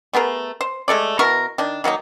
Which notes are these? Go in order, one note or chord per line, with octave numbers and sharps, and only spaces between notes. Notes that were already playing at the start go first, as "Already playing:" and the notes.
A3 B3 G#4 A#4
C5
G#3 A3 A4 D5
B2 E4 A#4 C#6
D#3 D4
D#3 F#3 A#3 D#4